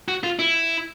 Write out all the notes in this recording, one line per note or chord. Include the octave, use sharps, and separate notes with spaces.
F#4
F4
E4